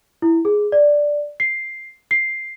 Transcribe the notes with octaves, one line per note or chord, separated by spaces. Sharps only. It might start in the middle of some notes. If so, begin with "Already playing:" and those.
E4
G#4
D5
C7
C7